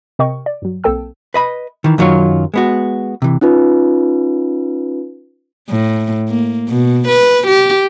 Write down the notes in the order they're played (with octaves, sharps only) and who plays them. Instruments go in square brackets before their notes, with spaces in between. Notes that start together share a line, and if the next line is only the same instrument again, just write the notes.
[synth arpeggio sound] C3 A#4 D#5 G5 C#6
D5
G2 F#3
B1 A#3 C4 A4 G5 E6
[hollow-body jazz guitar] B4 D#5 B5
D#3 E3
F#2 D#3 F#3 F4 C#5
G#3 B3 F#4
C3 E3
[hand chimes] C#4 D#4 F4 B4
[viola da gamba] A2
A#3
B2
B4
G4